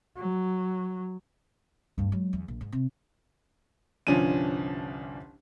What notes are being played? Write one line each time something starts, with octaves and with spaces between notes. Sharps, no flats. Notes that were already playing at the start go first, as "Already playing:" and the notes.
F#3
D2 G2
F#3 G#3
E2
A#1
G#2
C3
G1 C2 F3 C#4 D4 D#7